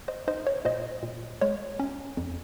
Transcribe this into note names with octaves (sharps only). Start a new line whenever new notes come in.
C5 D#5
D#4 C5 D#5
C#5
A#2 C5 D#5
A#2
G#3 C#5
C#4
F2